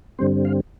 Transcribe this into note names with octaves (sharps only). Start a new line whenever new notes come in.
G2 D3 G3 C4 C5
F5